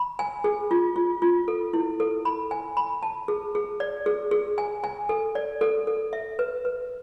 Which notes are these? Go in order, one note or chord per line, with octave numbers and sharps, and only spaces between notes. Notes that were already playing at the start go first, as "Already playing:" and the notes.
Already playing: B5
G#5
G#4
F4
F4
F4
A4
E4
A4
B5
G#5
B5
A5
G#4
G#4
D5
G#4
G#4
G#5
G#5
A4
D5
A4
A4
E5
B4
B4